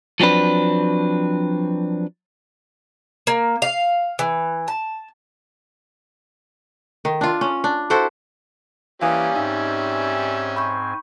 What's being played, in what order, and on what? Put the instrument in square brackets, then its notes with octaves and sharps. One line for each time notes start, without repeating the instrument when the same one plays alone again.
[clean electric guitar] F3 F#3 C4 D4 B4
[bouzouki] A#3
F5
E3
A5
[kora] D#3
D4 F4
C#4
D4
E4 F#4 A4 C5
[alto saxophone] E3 [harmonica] G3 C#4 [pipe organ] A#3 G4 [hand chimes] F5 G#5 D#6
[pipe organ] G#2 C4 G#5 [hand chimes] D#4 [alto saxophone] E5
[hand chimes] B5 C#6 G6